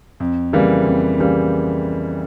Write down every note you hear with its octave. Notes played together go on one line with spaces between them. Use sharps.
F2
C#3 E3 G3 A#3
F2
C#3 E3 G3 A#3